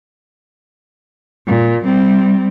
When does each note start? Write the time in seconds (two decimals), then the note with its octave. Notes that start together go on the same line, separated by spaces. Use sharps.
1.47 A#2
1.84 G3 C4